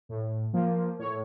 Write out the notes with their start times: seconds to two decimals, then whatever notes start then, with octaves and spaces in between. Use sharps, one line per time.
0.09 A2
0.53 F3 A#3
0.99 A2 C#5